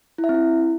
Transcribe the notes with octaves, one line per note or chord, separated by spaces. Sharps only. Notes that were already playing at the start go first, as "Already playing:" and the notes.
E4
E5
C4
E4